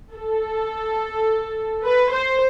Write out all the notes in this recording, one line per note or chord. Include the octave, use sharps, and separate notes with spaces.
A4
B4
C5